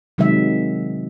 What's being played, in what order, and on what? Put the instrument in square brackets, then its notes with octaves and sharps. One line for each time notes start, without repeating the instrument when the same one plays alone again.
[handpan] C3 D#3 F#3 G#3 E5